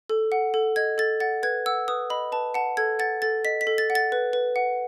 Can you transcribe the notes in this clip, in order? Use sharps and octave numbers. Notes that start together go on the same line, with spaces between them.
A4
F#5
A4
D#5 G#6
A4 A6
F#5 A6
B4 G#6
F#5 E6
B4 D#6
D#5 B5
B4 A5
F#5 A5
A4 G#6
F#5 A6
A4 A6
D#5 B6
B6
A4
A6
F#5
A6
B4
B4
F#5